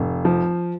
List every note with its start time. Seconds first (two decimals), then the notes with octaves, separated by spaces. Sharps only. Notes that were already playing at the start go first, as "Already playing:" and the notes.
Already playing: F1
0.25 F3